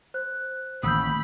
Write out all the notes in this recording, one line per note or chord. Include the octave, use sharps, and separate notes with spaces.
C5 F#6
A1 D3 D#3 A#3 B5 D#6 E6 G6